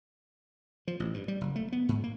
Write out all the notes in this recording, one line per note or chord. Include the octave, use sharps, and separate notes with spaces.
F3
A1
G2
G3
F#1
A3
B3
G#2
A#3